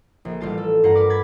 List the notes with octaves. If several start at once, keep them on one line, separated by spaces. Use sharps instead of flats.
A#1
A1 G3 F4 A5
A4
G2 F4 F#5 A#5
A#4 B4 D6
B5 G#6 A6 B6